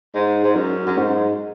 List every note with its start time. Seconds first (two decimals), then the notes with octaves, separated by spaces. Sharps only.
0.15 G#2
0.44 G#2
0.56 F#2
0.86 F#2
0.98 G#2